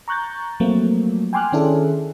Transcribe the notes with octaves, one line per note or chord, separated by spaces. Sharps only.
A#5 C#6 F#6 G6 A6
F3 F#3 A3 A#3 C4
G5 G#5 C6 D6 F6 F#6
D#3 C#4 D4 E4 G#4 A4